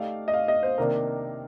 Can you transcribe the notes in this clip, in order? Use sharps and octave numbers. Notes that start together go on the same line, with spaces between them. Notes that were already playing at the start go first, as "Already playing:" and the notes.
Already playing: A3 D#4 G4 D5 F5
D#5
F5
D#5
C5
C3 D#3 A#3 D4 A#4